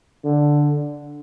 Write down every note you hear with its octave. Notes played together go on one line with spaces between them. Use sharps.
D3